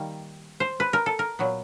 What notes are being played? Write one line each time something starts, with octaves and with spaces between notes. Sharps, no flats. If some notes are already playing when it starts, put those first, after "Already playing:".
Already playing: D#3 G3 A#3
C5
B4
A#4
A4
A#4
A#2 F#3 B3